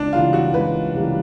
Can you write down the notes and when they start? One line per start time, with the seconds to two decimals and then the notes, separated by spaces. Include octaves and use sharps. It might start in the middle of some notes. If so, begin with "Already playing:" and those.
Already playing: C#2 D4
0.13 C#3 E3 G3 A#3 F4
0.33 F#4
0.54 C#2 B4
0.94 C#3 E3 G3 A#3